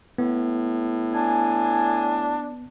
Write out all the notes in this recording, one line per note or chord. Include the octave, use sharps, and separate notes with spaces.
A2 B3
D4 G#5